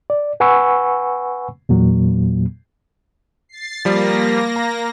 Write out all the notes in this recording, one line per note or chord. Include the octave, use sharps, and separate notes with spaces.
D5
B4 F#5 G#5 B5 C#6 E6
E2 A#2 F#3 A#3
A6 C7
F3 G3 A#3 A#6
A#5